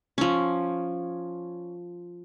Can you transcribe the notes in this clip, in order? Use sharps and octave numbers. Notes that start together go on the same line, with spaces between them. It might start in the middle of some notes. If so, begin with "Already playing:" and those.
F3 C#4